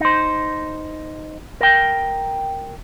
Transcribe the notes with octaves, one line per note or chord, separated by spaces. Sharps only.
D#4 C5
A#4 G5